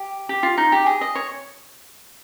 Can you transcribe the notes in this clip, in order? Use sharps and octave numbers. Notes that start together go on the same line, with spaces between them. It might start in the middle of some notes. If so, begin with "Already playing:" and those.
Already playing: G4
G4
F4
D#4
G4
G#4
D#5
C#5